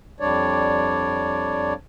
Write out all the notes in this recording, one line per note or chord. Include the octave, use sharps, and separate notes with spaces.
F2 G3 D4 C#5 D5